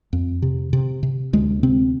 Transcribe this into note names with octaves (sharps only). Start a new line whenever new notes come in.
F2
C3
C3
C3
D2 G#3
C3 C4